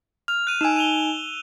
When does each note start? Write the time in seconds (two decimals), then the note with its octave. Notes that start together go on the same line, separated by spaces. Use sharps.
0.28 F6 F7
0.47 F#6 D#7
0.61 D#4 G#5 E6 E7
0.76 D#7 F7 G7